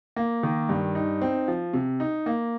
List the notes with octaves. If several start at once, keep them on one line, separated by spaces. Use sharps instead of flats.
A#3
D#3
G2
D#4
C4
F3
C3
D#4
A#3